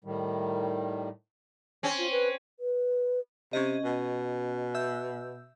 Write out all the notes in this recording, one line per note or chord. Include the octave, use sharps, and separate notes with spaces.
A2 D#3 G3
C4 C#4
F4
B4
B4
C3 C#4 D#5
B2
E5 E6 G6